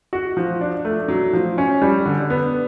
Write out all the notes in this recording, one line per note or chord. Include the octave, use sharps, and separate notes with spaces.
F#4
F3
D4
A3
F#3
F3
C#4
G3
D3
B3